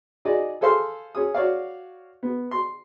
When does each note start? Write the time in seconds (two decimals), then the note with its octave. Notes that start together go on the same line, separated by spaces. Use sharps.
0.25 D#4 F#4 G#4 D5 D#5
0.61 G#4 A4 C5 F5 C6
1.15 C#4 G#4 D#6
1.34 F#4 C#5 D5 F5
2.23 B3
2.51 C6